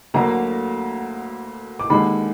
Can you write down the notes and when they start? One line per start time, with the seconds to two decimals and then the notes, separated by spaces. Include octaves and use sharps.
0.14 D2 D3 F#3 A#3 A#5
1.80 D6
1.90 D#2 D3 G#3 B5